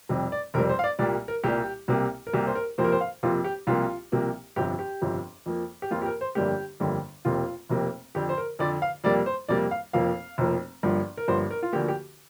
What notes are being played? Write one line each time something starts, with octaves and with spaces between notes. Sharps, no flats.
F1 F2 C3 G3
D5
F1 F2 C3 G3 A#4
C5
F5
D5
C2 A#2 G3 A#3 D5
A#4
C2 A#2 G3 A#3 G4
C2 C3 A#3
A#4
C2 C3 A#3 G4
C5
A#4
F2 C3 F3 A#3 C5
A#4
C5
F5
F2 C3 F3 A#3 F4
G4
C2 C3 F3 A#3 F4
C2 C3 F3 A#3
G1 F2 C3 F3 G4
G4
G1 F2 C3 F3
F2 F3 A#3
G4
F2 F3 A#3 F4
G4
A#4
C5
G1 F2 D3 G3 A#3 G4
G1 F2 D3 G3 A#3
F1 F2 C3 A#3 F4
F1 F2 C3 A#3
F2 D3 F3 G4
C5
A#4
F2 D3 F3 D5
F5
F2 C3 G3 A#3 D5
C5
F2 C3 G3 A#3 D5
F5
F1 F2 F3 A#3 F5
F1 F2 F3 A#3
G1 G2 F3 A#3
A#4
G1 G2 F3 A#3 C5
A#4
F4
D2 D3 F3 A#3 G4
G4